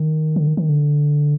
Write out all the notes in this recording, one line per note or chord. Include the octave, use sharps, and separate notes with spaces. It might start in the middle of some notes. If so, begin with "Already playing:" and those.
Already playing: D#3
D3
D#3
D#3
D3